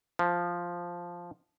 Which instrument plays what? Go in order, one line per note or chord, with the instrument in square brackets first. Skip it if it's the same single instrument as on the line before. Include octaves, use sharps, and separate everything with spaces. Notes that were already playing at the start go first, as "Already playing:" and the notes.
[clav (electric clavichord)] F3